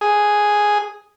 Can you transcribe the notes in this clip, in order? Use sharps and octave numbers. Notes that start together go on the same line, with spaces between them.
G#4